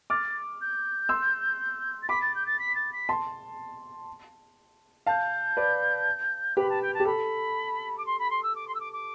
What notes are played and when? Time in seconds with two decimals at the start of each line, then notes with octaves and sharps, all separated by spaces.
0.10 D6 F6 A6
0.61 G6
1.09 C6 E6
2.01 A6
2.09 B5 D6 B6
2.21 A6
2.34 G6
2.46 A6
2.59 B6
2.75 A6
2.92 B6
3.09 A5 C6
5.06 F5 A5 G6
5.57 B4 D5
6.56 G4 B4 B5
6.69 A5
6.81 G5
6.93 A5
7.00 G4
7.05 A4 B5
7.97 D6
8.05 C6
8.18 B5
8.30 C6
8.42 E6
8.55 D6
8.67 C6
8.74 E6
8.79 D6
8.92 D6